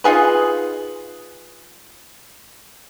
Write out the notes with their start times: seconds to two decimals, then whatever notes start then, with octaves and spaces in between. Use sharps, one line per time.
0.04 D#4 F4 G#4 B4